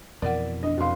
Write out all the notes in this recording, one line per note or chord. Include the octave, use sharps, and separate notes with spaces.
F2 B2 E3 A#4 D5 F#5
D4 D#5
F1 F#4 F5 C6